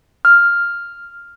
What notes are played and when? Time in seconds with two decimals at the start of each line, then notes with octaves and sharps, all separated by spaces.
0.25 F6